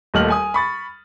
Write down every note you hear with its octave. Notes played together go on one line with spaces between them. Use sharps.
D#1 D#2 A3 D#5 F6 F#7
G#5 D#6
B5 C#6 A6